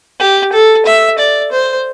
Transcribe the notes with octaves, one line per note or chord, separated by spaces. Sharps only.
G4
A4
E5
D5
C5